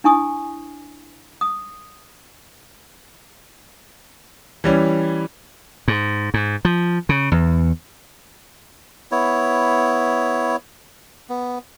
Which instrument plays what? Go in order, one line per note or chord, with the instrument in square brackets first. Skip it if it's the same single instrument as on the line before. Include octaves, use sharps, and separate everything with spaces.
[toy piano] D4 E4 G#5 C#6 D#6
D#6
[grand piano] E3 G3 C#4
[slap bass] G#2
G#2
F3
C#3
E2
[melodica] B3 E4 C#5
B3